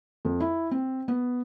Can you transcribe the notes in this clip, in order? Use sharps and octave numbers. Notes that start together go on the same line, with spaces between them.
F2
E4
C4
B3